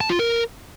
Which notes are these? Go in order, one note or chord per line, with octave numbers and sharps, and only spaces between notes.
A5
F4
A#4